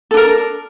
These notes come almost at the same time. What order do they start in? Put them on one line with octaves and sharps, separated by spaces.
A4 D4 A#4